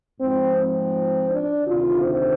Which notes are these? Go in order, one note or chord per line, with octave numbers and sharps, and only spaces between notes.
G#2 F3 C4
C4
D4
D2 C3 D#3 F4
C5